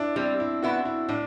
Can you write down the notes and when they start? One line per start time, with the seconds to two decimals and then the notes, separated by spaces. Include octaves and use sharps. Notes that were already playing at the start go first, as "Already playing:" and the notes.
Already playing: D4 E4
0.16 G3 C4
0.40 E4
0.62 B3 E4 F#4
0.85 E4
1.09 A2 D4